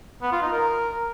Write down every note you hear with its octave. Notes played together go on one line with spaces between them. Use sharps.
B3
F4
D#4
A#4